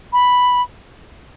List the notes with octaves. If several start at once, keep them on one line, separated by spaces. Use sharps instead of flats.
B5